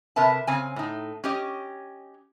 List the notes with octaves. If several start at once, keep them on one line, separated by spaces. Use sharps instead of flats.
C3 A#4 B4 E5 A5
C#3 C4 G#5
A2 D#4
C#4 G4 D#5